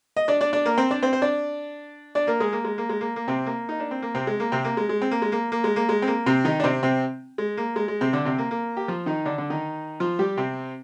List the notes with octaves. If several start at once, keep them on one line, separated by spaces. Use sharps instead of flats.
D#5
D4 D5
D4 D5
D4 D5
A#3 A#4
C4 C5
D4 D5
C4 C5
C5
D4 D5
D4 D5
A#3 A#4
G#3 G#4
A#3
G#3
A#3
G#3
A#3
A#3
C3 C4
A#3
D#4
D4
C4
A#3
C3 C4
G#3
A#3
C3 C4
A#3
G#3
G#3
C4
A#3
G#3
A#3
A#3
G#3
A#3
G#3
C4
A#3
C3 C4
D#3 D#4
D4
C3 C4
C3 C4
G#3
A#3
G#3
G#3
C3 C4
D3 D4
C3 C4
A#3
A#3
G4
F3 F4
D#3 D#4
D3 D4
D3 D4
D#3 D#4
F3 F4
G3 G4
C3 C4